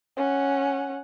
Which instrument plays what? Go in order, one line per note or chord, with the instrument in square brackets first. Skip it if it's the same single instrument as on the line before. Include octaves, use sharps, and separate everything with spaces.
[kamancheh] C#4 F#5